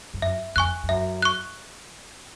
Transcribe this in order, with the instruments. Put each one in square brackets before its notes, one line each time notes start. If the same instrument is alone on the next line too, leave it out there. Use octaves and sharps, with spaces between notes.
[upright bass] G2
[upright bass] F#2 [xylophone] E5
[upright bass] F2 [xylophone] G#5 C#6 F#6
[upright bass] F2
[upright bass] F#2 [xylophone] E5
[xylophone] C#6 F#6